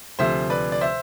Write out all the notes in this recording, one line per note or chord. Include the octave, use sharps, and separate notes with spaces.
D2 C3 F3 C5 E5
B4 D5
D5
C5 E5